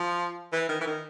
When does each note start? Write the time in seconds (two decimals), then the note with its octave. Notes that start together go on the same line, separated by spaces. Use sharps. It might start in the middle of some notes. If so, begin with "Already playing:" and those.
Already playing: F3
0.53 E3
0.69 D#3
0.81 E3
0.87 D#3